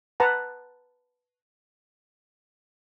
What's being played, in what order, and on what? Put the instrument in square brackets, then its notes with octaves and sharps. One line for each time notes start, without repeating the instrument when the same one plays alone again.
[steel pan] B4 F#5 A5 A#5